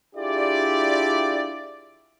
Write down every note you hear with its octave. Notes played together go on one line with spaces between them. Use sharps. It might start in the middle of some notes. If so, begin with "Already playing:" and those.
D4 E4 F4 G4 G#4 D5